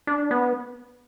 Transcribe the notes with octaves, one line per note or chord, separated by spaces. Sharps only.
D4
B3